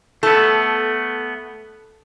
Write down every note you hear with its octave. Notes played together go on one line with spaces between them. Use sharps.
A3 B3 A4